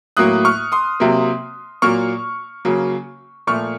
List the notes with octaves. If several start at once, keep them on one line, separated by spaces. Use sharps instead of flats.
A2 F#3 A#3 D#6 F#6
C#6 F6
C6 D#6
C3 F#3 A#3
A#2 F#3 A#3 C#6 F6
C#3 F#3 A#3
A#2 F3 A3 C#6 F6